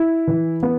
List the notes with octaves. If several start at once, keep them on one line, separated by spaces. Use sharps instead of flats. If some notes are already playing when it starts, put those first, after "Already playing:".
Already playing: E4
E3
B3